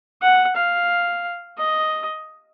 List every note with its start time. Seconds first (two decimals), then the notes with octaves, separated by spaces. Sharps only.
0.22 F#5
0.56 F5
1.58 D#5